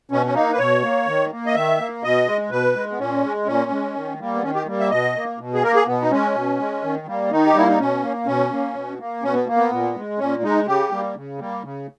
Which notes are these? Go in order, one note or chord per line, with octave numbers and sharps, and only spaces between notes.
B2 C#4
C#4
A#3 D#4
B4
B2 C#5
A#3
D#3
A#3
D#5
D#3 E5
A#3
B2 D#5
G#3
B2 B4
G#3
B3
A#2 C#4
G#3
A#2 C#4
G#3
D#3
G3 A#3
B3
D#3 C#4
G4
G3 A#3
E5
B2 D#5
A#3
B2
G#4
A#3 A#4
G#4
B2 B3
D#4
G#3 C#4
B2
G#3
D#3
G3 A#3
D#3 D#4
G4
G3 A#3 E4
D#4
B2 C#4
A#3
B2 C#4
A#3
B2
A#3
B2 C#4
B3
A#3
B3
A#2
G#3
A#2 C#4
G#3 D#4
C#3 G4
G3 A#3
C#3
G3 A#3
C#3